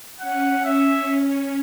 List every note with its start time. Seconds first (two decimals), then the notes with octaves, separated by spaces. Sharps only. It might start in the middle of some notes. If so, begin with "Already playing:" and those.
0.21 C#4 F#5
0.65 E5